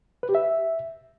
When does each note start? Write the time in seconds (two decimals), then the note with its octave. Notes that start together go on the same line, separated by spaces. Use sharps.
0.23 B4
0.29 G4
0.35 E5